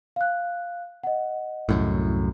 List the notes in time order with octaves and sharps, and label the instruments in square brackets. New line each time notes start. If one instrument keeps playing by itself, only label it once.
[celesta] F5 F#6
D#5 F#5
[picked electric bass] C2 F#2 A2